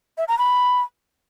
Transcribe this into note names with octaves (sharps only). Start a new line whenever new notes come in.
E5
A#5
B5